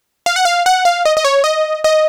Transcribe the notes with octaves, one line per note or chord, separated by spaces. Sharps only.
F5
F#5
F5
F#5
F5
D#5
D#5
C#5
D#5
D#5